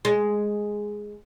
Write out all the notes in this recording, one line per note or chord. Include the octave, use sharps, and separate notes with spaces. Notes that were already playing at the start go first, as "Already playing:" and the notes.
G#3